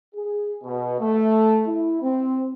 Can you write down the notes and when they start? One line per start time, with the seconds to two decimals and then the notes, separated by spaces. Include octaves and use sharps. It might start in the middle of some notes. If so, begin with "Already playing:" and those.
0.15 G#4
0.63 B2
1.00 A3
1.67 E4
2.02 C4